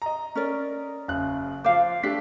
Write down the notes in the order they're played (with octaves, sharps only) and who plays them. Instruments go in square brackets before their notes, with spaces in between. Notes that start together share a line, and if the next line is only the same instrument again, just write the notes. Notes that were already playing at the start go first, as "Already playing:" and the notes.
[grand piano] D#5 A#5
[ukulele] C#4 A#4 D5
[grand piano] F#1 C#3 F#6
[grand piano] F3 D6 [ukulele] C5 F5
[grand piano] A3 G4 B6 [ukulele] D4